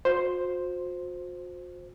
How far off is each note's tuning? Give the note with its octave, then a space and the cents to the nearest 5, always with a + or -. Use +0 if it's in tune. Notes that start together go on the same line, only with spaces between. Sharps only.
F#4 -45 C5 +0